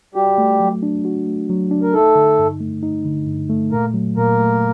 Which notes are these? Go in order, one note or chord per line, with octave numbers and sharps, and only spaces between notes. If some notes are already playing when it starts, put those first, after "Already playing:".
G3 F#4 G4
A3
F#3
D4
F#4
A3
F#3
D4
A#4
A3 D#4 A4
D3
G2
A3
D#4
D3
G2
A3
A#2 A#3 A#4
F#3
A#2 A#3 A#4
A3